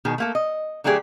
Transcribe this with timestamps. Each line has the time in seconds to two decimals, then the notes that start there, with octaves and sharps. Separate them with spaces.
0.05 B2 D#3 G#4
0.18 A3 A#3 A4
0.35 D#5
0.84 D3 F#3 A3 G4 G#4 D5